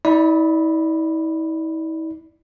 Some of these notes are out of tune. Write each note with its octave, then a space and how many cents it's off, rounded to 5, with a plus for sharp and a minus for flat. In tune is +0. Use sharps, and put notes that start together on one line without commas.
E4 -45 D5 +0 B5 +0